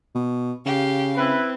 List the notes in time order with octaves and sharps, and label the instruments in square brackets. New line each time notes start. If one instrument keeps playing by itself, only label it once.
[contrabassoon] B2
[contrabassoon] C#3 [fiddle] G4 F5
[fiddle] C4 [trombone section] E4 B4